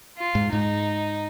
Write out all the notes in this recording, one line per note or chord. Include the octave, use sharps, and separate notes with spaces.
F4
G#2
G#2 D#4